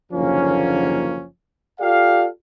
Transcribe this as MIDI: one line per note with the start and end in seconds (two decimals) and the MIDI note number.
0.12 1.24 30
0.12 1.24 39
0.12 1.24 50
0.12 1.24 53
0.12 1.24 58
0.12 1.24 61
1.81 2.27 65
1.81 2.27 67
1.81 2.27 69
1.81 2.27 74
1.81 2.27 77